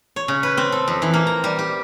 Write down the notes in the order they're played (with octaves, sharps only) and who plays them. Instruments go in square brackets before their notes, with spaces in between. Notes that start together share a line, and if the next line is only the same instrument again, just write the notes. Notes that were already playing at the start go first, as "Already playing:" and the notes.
[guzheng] C#5
C#3
B4
C4
A4
F2
E3
A#3
A#5
G3
G4